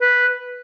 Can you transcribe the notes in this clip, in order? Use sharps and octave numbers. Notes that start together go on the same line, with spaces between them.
B4